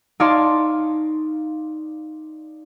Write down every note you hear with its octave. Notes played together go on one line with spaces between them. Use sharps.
D#4 C#5 D5 F5 A5 C6